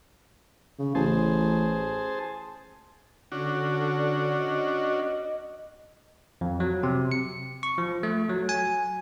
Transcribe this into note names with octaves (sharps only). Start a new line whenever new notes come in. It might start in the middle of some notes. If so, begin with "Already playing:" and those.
C#3
A1 G#4 C5 A5
D3 C#4 D4 F#4
D#5
F2
F#3
C3
C#7
C#6
F3
A3
F#3
G#5